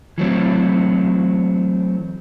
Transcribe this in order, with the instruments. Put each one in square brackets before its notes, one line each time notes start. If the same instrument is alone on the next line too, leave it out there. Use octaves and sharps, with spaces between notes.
[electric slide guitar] E3 F#3 A3 C4